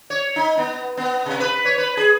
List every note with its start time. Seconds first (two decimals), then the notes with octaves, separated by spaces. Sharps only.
0.10 C#5
0.36 D#4
0.57 B3
0.97 B3
1.26 C3
1.40 B4
1.65 C#5
1.78 B4
1.97 G#4